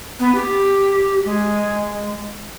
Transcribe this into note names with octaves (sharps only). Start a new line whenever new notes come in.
B3
G4
G#3